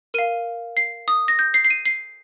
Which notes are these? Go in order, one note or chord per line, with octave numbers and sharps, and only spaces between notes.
A#4 F5 D#7
C7
D#6
A#6
G6
C7
C7
D#7
C7